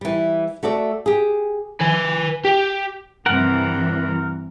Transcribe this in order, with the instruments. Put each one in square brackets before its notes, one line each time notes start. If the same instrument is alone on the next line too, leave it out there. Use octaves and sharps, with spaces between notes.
[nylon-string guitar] E3 G3
A3 F#4 A4 D5
G4 G#4
[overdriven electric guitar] B4 G#5
G4
[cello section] G2 C3 E3 [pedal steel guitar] A#4 F#5